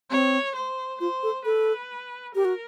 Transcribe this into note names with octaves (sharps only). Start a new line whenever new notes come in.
C4 C#5
C5
F4 C5
A4
A4 B4
G4 A#4
F#4